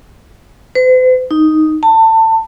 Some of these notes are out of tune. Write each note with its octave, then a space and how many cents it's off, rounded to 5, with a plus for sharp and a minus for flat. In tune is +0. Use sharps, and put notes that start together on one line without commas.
C5 -45
D#4 +0
A5 +25